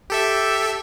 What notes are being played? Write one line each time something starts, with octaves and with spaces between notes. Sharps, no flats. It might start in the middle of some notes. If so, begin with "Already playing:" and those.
G4 A4 E5